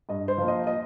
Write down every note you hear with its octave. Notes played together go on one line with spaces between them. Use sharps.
G2 D#5
C5
F3 A#3
D#5
D#5